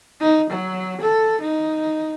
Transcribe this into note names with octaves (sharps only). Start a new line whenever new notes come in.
D#4
F#3
A4
D#4